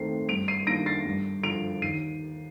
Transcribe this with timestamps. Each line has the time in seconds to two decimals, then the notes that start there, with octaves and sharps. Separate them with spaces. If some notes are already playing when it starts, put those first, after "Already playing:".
Already playing: D#2 D#3 A3 C4 C7
0.29 G2 D7 F7
0.48 C7 D#7
0.67 D#3 A#3 D4 A#6 D7
0.86 A6 C7
1.06 G2
1.44 D3 F3 D7 F7
1.82 D#2 C7 D#7